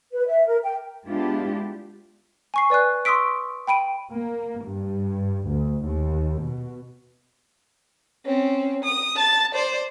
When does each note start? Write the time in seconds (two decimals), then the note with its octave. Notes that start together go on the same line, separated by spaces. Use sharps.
0.13 B4
0.27 E5
0.46 A#4
0.63 G5
1.06 G#3 B3 D4 E4 F4 G4
2.54 G#5 C#6 C7
2.70 B4 D5 G#5 F#6
3.05 C6 C#6 D#6 E6 B6 D7
3.67 G5 B5 D7 D#7
4.12 A#3
4.64 G2
5.48 D2
5.84 D#2
6.40 B2
8.25 C4 C#4
8.84 D#6
9.16 A5 A6
9.54 C5 D5